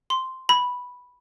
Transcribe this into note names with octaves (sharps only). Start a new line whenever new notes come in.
C6
B5